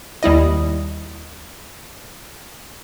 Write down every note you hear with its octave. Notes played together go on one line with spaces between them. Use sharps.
D#2 G3 E4 D#5